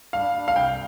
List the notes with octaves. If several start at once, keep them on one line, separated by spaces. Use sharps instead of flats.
G2 F5
G2
F5
C2 G5